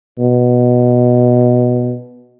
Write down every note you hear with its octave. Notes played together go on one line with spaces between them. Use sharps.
B2